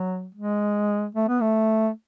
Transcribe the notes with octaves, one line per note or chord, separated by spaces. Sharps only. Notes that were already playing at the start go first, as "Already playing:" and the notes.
Already playing: F#3
G#3
A3
B3
A3